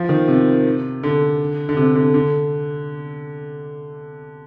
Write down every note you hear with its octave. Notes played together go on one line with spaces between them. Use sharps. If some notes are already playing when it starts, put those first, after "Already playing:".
Already playing: F3
D#3
C3
D3
D3
C3
D3
D3